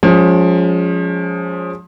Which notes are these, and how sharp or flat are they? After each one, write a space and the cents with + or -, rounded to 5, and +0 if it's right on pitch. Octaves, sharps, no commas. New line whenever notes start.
F3 +30 G#3 +0 C#4 +25